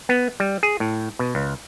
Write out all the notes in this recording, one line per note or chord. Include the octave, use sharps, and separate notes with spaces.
B3
G3
G#4
A2
B2
C#2